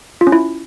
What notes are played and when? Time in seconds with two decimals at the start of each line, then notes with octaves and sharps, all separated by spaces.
0.21 F4
0.27 C#4
0.32 E4